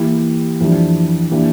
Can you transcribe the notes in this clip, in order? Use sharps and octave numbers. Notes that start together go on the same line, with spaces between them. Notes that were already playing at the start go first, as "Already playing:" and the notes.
Already playing: E3 A#3 E4 G4
F2 E3 G3 D4
E3 A#3 D4 G4